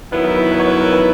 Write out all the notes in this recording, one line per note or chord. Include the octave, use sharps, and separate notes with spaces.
D#3 F#3 B3 E4 B4
A#4
B4
B4
C#5
B4
A#4
B4